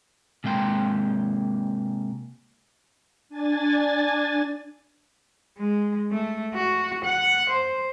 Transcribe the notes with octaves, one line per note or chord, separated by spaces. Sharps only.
C3 G#3 A#3 G5 C6
D4 G#5 A6
G#3
A3
F#4
F#5
C5